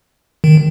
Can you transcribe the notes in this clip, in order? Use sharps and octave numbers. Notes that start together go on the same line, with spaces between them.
D#3